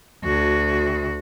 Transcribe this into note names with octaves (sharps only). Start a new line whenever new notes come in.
D2 F#4